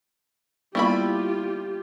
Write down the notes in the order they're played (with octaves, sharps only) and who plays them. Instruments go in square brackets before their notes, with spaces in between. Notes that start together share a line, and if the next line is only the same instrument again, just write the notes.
[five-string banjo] G3 E4 B5 [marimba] A#3 B3 C#6 [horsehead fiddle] F4 G4